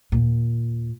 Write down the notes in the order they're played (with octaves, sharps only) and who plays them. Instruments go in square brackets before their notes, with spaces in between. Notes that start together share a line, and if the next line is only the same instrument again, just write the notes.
[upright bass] D#2 A#2